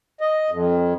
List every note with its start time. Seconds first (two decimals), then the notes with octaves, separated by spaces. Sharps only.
0.21 D#5
0.50 F2